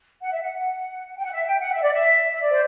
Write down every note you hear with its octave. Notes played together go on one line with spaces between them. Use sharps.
F#5
E5
F#5
G5
F#5
E5
G5
F#5
E5
D5
E5
E5
D5
C5